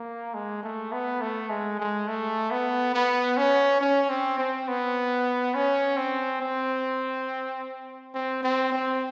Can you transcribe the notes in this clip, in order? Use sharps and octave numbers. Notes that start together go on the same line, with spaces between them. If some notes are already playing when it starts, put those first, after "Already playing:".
Already playing: A#3
G#3
A3
B3
A3
G#3
G#3
A3
B3
B3
C#4
C#4
C4
C4
B3
C#4
C4
C4
C4
C4
C4